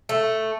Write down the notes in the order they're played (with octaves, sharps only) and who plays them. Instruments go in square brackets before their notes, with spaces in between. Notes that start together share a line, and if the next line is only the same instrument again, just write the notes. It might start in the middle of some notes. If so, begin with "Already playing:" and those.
[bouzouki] A3